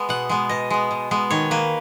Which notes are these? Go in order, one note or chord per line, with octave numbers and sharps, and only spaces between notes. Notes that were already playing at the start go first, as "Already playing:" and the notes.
Already playing: G#3 B3
B2 F#5
G#3 B3
B2 D#5
G#3 B3
B2
G#3 B3
D#3 C#5
A#3 B4